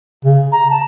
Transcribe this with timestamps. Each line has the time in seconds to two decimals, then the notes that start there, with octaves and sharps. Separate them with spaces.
0.25 C#3
0.52 A#5
0.71 A5